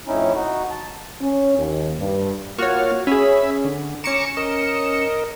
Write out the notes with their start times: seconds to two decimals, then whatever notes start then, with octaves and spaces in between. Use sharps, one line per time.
0.07 F2 A2 C#4 D#4 E4
0.35 D#4 F#4
0.71 A5
1.21 C#4
1.58 D#2
1.98 G2
2.59 A#3 F4 F#4 C#5 F6
3.07 C#4 G#4 E5 B5
3.65 D3
4.04 C#4 A#5 C#6 D6 C#7 E7
4.37 A#4 D#5